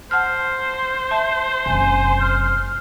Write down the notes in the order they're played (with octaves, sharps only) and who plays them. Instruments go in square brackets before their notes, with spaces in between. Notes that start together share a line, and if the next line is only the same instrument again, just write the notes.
[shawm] C5 [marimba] F#5 A5 F6
[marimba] C6
E5 A5
[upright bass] F#1 C3 [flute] G#5
[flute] F6